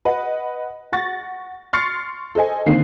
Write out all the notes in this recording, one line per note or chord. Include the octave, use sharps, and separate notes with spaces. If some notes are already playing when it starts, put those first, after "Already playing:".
B4 D#5 F#5
F#5 C#6 A6 A#6
C6 C#6 F6 A6 C7 C#7
A4 C5 D#5 G#5
D3 D#3 A#3 C4 D#4 C7